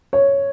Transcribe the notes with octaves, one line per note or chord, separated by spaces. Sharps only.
C#5